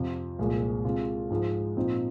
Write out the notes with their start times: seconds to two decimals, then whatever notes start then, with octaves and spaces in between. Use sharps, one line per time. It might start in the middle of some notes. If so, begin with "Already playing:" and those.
Already playing: F2 C3 F3
0.39 C2 A#2 F3 G#3
0.85 C3 G#3 F4
1.30 G#2 F3 G#3
1.76 A#2 F3 C4 D#4